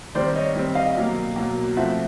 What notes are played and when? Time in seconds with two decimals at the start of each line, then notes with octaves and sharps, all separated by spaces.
0.15 D#3 G3 C4 C5 D5
0.35 C#5 D#5
0.56 D#3 G3 C4
0.75 D#5 F5
0.96 B2 F#3 A#3
1.36 B2 F#3 A#3
1.77 F3 A3 C4 F4 E5 F#5